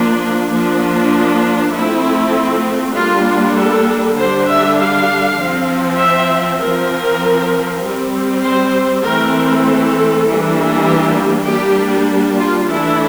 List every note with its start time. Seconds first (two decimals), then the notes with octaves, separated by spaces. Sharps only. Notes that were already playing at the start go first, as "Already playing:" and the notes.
Already playing: F3 A#3 D4
0.51 F3 A#3 D4
1.73 F3 A3 C4 E4
2.94 G3 A#3 D4 F4
3.55 A4
4.16 D3 G3 D4 C5
4.47 E5
4.77 F5
5.37 F3 C4
5.98 E5
6.60 F3 C4 A#4
7.81 G3 C4
8.43 C5
9.03 E3 A3 C4 A#4
9.65 A4
10.25 E3 G3 A#3 D4
10.86 G4
11.47 G3 A#3 D4 G4
12.39 F4
12.68 E3 A3 D4 E4